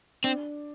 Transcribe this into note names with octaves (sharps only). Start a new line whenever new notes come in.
C4 D4